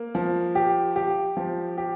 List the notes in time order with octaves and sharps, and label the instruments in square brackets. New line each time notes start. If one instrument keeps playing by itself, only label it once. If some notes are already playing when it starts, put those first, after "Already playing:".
Already playing: [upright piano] A#3
F3
G4
G4
F3
G4